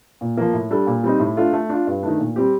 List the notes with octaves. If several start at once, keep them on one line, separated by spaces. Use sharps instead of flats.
A#2
F3 A#3
A2
G3 D4 A4
A#2
G3 C4 D#4
A2
A3 D4 F4 A4
A3
D4 F4
G2
D#3 A3 D4
A#2
G3 C4 G4